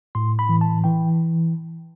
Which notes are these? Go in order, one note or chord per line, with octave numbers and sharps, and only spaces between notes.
A2 C6
B5
E3
A5
E3 G5